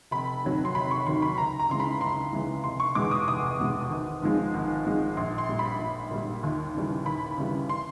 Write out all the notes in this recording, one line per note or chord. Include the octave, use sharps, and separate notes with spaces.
F1 B5
D#2 D#3 F#3
C6
F1 B5
C#6
D#2 D#3 F#3 C6
B5
C#2 A#5
A#5
C#3 E3 G#3 C6
B5
C#2 C6
C#3 E3 G#3
F1 C6
C#6
E2 B2 G#3 D6
D#6
F1 D#6
E2 B2 G#3
G#1
G#2 F3 G#3
G#1
G#2 F3 G#3
A#1 C6
C6
A#2 G3
B5
A#1
A#2 G3
D#2
C#3 E3 G3
D#2 B5
C#3 E3 G3
C6